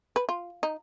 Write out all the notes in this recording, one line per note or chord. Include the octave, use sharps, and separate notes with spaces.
B4
F4
D#4